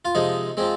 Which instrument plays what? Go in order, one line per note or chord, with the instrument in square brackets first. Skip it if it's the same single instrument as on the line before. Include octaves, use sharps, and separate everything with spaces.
[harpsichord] F4
C3 F3 G#3 D#4
F3 G#3 C4